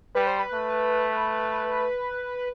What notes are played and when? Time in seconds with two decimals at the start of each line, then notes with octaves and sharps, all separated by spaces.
0.15 G3 B4
0.27 C5
0.39 B4
0.53 A3